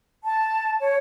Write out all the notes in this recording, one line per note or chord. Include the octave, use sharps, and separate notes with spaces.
A5
C#5